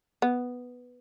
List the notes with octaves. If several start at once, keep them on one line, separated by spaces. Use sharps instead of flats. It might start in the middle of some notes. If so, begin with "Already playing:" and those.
B3